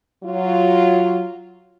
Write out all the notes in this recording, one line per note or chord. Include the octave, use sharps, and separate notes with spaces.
F#3 F4